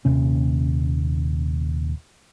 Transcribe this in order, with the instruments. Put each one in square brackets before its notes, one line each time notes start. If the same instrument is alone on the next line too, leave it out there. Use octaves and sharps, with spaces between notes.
[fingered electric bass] D#1 D#2 C3 C#4